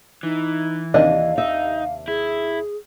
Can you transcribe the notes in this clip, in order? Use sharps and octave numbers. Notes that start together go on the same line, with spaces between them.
E3 D#4
D#2 C3 D4 D#5 F5
D#4 E5
E4 G#4